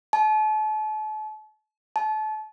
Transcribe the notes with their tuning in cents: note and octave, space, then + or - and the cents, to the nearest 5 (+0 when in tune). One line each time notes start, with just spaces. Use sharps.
A5 -40
A5 -30